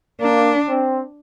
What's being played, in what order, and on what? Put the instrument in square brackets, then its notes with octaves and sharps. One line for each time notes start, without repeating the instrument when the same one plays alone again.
[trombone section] A#3 [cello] D4
[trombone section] C4